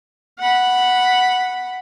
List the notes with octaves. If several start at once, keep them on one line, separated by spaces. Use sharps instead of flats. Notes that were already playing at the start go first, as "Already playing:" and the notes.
F#5 B5